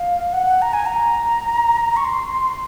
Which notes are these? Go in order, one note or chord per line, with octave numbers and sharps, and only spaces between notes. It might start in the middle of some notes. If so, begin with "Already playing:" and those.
Already playing: F5
F#5
A#5
G#5
A#5
C#6
C6